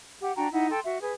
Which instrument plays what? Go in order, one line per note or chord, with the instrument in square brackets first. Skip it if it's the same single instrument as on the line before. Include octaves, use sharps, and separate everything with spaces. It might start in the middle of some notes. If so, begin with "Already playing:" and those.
[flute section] G4 F#5
D4 F#4 G5 A#5
D#4 E4 F#5
A4 G5 C6
F#4 E5
G#4 B4